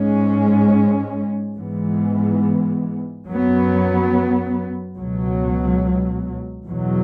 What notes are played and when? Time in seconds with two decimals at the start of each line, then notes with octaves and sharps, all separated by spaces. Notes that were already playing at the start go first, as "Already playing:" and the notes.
Already playing: G#2 G#3 C#4
1.57 G#2 E3 G#3 B3
3.27 F#2 F#3 B3
4.97 C#2 B2 F#3
6.66 E2 B2 F#3